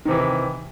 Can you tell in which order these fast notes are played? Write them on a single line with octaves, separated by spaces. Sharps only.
D#3 C3 E3